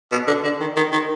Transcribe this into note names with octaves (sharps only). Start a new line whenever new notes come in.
B2
D3
D3
D#3
D#3
D#3